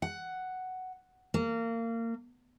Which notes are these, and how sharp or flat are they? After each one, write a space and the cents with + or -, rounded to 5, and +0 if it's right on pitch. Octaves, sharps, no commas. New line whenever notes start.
F#5 +5
A#3 -25